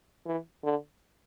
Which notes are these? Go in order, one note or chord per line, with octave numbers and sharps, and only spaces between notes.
E3
D3